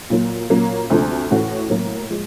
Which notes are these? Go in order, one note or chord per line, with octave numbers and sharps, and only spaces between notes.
A#2 F#3 A#3
A#2 F#3 A#3 C#4
D2 C3 F3 A3 D4
A2 E3 A3 C#4 F#4
A2 F#3 A#3
F3 G#3